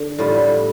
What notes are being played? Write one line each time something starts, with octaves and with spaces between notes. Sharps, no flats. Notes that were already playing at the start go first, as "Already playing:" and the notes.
Already playing: D3 G4
A2 G3 F4